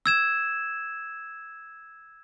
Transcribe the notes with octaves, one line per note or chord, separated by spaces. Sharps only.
E6 G#6 E7